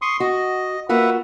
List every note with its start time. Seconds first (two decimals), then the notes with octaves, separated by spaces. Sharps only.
0.02 C6 C#6 D#6
0.20 F#4 D#5
0.89 A#3 F4 F#4 B4 E5 F#5